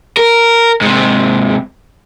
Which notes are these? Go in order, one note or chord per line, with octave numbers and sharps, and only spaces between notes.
A#4
G#2 C3